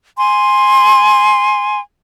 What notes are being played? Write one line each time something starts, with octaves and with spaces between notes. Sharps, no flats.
G#5 C6